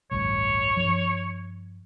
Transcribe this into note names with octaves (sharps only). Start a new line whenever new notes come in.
A1 D2 G2 C#5
G2 F3